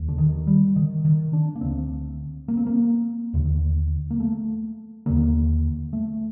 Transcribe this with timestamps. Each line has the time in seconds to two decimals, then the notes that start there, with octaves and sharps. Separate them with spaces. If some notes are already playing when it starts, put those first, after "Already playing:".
Already playing: D#2
0.09 D3
0.18 D#3
0.47 G3
0.76 D#3
1.05 D#3
1.33 D4
1.55 A#3
1.61 D2 D3 C4
2.48 A#3
2.57 C4
2.67 A#3
3.34 D#2 D3
4.11 A#3
4.20 A3
5.06 D#2 D3 A#3
5.93 A3